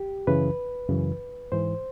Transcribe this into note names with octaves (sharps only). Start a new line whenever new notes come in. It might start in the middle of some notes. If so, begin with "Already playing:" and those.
Already playing: G4
F#2 C#3 E3 B4
F#2 C#3 E3
G#2 E3 C5